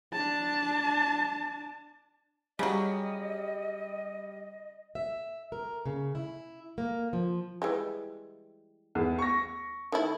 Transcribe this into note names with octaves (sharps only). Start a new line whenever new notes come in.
D4 A5
C#3 F#3 G3 D#5
E5
A#4
C#3
E4
A#3
F3
E3 G3 G#3
E2
C#6 A#6
D#3 A3 E4